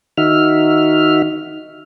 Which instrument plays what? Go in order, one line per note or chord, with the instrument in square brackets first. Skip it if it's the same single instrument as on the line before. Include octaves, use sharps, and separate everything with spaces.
[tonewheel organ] D#3 D#4 F#4 E5 F6